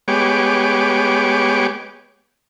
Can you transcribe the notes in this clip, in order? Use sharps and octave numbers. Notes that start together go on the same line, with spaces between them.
G#3 B3 G4 C#5 D6